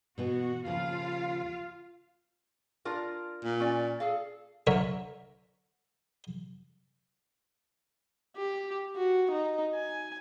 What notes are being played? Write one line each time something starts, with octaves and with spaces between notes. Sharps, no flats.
B2 E3 B3 F#4
D#2 C#3 F3 F4 F5
D4 F4 A#4
A#2
C#4 D5
G#4 A4 F5
D3 A#4 C#5 E5
G4
F#4
D#4
G#5